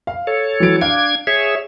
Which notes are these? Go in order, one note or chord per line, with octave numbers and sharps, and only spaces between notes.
F5
A4 C#5
E3 F#3 D7
D4 F5 G#6
G#4 C#5 E5